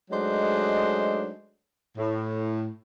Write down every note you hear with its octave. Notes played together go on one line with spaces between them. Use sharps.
F#3 G#3 A3 D4 D#4 C5
A2